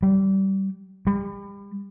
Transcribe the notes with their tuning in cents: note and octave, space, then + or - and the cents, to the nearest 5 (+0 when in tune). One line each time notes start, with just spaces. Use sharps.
G3 -20
G3 +35